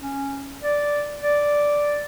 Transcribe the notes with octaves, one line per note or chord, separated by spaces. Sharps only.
C#4
D5
D5